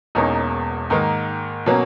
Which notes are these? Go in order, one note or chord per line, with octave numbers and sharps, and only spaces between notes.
E1 E2 B2 A#3 C#4 D#4
G#2 D#3 A#3 D#4
B2 F#3 A#3 C#4